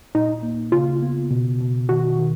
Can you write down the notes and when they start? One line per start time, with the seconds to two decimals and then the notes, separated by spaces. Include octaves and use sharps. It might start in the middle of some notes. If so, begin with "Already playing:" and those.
0.15 A#2 D#4
0.43 A#3
0.72 C#3 F4
1.02 B3
1.31 B2
1.61 B2
1.89 D#3 F#4
2.19 D#3